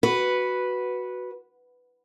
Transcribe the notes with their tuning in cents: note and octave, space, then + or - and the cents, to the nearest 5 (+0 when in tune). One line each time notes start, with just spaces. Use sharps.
F#4 +0 B4 -5